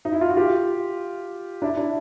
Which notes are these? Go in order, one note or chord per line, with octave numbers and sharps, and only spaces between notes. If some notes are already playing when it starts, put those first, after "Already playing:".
D#4
E4
F4
F#4
F4 G4
D4 E4
D4 E4